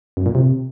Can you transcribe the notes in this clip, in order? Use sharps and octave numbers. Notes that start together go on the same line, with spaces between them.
F#2
A#2
C3